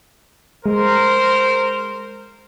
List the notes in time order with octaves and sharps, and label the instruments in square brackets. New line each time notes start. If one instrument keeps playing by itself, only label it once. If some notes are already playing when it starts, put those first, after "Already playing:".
[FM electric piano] G#3 [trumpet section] A#4 C5